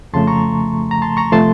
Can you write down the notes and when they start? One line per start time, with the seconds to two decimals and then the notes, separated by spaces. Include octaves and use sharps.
0.13 F2 C#3 F3 A3 A5 C6
0.28 A#5 C#6
0.91 A#5
1.02 A5 C6
1.17 A#5 C#6
1.32 C3 F3 A3 A5 C6